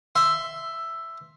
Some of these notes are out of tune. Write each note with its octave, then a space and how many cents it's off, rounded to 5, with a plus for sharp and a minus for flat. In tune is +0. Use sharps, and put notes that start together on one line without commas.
E5 +5 C6 +0